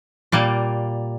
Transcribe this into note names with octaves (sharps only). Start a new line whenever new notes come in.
A#2 G3 A#3